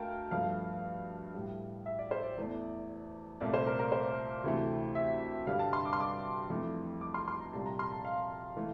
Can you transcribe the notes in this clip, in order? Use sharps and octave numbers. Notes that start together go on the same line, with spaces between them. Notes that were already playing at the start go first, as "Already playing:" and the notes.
Already playing: D2 A3 A#4 F5 G5 A5
G2 F3 A3 F5
A2 G3
E5
D5
C5
D5
E2 E3 A3
C2 A#2 A3 D5
C5
A#4
A#4
C5
D2 C3 E3 A3
E5
G2 D3 G3 F5
A5
C6
D6
C6
D6
F2 E3 A3
D6
C6
C6
A#5
C2 A#2 G3 A5
A#5
C6
A5
F5
E3 A3